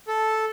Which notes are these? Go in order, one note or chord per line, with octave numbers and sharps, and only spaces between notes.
A4